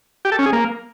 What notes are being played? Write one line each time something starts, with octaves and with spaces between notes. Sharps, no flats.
G4
A4
C#4
G#4
A#3